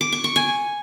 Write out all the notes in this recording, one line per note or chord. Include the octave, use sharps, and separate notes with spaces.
D6
C#6
C#6
G#5